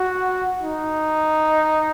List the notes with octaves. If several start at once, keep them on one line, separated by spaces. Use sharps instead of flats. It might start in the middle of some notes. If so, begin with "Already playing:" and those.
Already playing: F#4
D#4